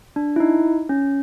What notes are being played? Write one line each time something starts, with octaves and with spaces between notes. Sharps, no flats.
D4
E4
D#4
C#4